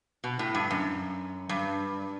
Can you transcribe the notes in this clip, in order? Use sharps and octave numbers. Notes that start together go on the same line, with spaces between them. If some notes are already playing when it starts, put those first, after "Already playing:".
B2
A2
G2
F#2
G2